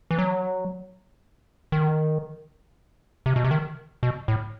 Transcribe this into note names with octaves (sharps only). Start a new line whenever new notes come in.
E3
F#3
D#3
C3
B2
C3
D#3
B2
A2